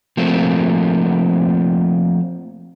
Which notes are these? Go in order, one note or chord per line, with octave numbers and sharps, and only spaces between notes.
F3 A3 A#3 C4